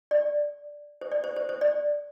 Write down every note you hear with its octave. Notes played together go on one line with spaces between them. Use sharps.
D5
C5
D5
C5
C5
C5
D5